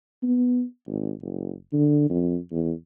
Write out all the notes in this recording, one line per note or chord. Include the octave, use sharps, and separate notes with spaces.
B3
G#1
F#1
D3
F2
E2